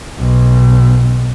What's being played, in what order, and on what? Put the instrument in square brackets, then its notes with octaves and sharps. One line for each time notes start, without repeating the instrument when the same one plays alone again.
[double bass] B1